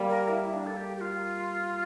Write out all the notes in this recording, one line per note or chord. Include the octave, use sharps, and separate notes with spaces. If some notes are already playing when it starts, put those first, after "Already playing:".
Already playing: G3 A#3
A#4
E4
E4
D4
A4
G4
G4
F4